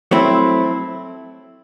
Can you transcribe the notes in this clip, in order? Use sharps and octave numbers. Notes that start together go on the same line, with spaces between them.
F#3 A3 C4 E4